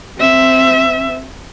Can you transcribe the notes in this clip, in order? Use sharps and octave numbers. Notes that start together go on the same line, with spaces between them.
C4 E5